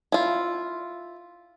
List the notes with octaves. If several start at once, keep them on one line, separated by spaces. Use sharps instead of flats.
E4 F4